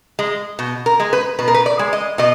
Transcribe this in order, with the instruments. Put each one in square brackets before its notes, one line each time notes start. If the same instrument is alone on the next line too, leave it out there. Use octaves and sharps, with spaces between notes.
[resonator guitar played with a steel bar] G#3
B2
A#4
G#3
B4
B2 B4
A#4
B4
D5
G#3
D#5
B2 D#5